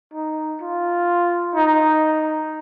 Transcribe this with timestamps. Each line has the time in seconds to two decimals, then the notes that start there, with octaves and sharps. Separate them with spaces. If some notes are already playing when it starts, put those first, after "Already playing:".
0.14 D#4
0.61 F4
1.55 D#4